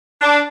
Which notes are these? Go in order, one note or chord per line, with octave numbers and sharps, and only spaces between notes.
D4